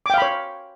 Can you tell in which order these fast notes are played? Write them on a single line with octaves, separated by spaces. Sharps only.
D6 G5 F5 B5 C#5